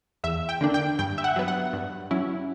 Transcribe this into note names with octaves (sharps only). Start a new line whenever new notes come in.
E2 E5
G5
D3 A#3 D4
G5
G2 G5
E5
F#5
F#3 B3
F#5
G2
F#3 C#4 E4